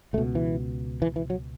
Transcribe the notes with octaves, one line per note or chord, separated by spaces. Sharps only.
C#2 B2 A3
E3
E3
E3
F#3